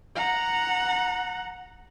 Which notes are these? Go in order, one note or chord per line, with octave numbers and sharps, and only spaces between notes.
F#5 A#5